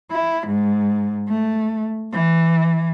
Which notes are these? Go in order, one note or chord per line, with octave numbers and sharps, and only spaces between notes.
E4
G#2
A3
E3